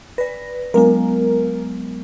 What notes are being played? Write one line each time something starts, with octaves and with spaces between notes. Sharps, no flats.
B4 D5 A#6
F#3 G#3 B3 A#4